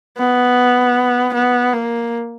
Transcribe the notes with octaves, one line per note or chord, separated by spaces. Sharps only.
B3
B3
A#3